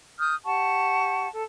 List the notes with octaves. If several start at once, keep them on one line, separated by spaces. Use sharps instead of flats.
D#6 F6 G6
G4 F#5 A5 C#6
A4